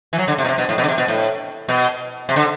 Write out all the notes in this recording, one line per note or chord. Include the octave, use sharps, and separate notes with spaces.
E3
F#3
D3
C3
B2
C3
B2
A2
B2
D3
C3
B2
A2
B2
C3
D3